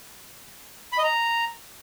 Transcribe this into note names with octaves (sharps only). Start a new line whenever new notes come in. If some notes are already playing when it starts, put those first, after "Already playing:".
B5
D#5
A#5